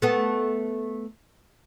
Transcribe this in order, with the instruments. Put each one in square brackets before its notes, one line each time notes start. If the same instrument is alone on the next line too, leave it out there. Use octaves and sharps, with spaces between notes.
[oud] A3 B3